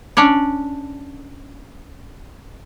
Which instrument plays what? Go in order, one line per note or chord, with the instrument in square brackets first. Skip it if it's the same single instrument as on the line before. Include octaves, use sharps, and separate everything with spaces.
[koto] C#4 D4 C#5 D5